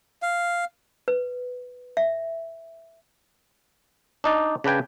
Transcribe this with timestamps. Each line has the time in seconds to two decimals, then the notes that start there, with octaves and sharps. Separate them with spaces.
0.22 F5
1.08 B4
1.97 E5
4.24 D4 D#4 D5
4.64 C#3 D4 B4 G5 G#5